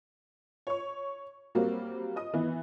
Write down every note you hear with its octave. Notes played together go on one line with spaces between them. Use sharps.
C#5 C#6
F#3 G3 A#3 C4 F#4
D#5 D#6
E3 B3